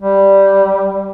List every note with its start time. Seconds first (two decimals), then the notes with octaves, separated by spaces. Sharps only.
0.01 G3